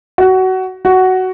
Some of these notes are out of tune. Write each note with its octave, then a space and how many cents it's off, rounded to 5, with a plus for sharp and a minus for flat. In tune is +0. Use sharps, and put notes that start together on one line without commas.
F#4 +20
F#4 +10